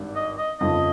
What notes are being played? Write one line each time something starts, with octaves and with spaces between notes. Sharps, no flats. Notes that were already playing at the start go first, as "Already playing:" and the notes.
Already playing: G#1 G2 D#3
D#5
D#5
G1 F2 C#3 F3 D#5